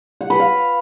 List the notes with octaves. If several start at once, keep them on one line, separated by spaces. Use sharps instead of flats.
F#5
B4
F5